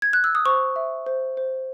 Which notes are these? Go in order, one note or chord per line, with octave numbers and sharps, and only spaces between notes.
G#6
F#6
E6
D#6
C5 C#6
E5
C5
C5